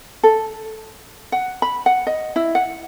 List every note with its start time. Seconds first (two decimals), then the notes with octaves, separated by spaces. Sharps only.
0.23 A4
1.32 F#5
1.62 B5
1.86 F#5
2.07 D#5
2.36 E4
2.55 F#5